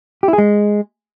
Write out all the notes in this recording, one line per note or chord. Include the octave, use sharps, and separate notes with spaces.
G4
E4
G#4
G#3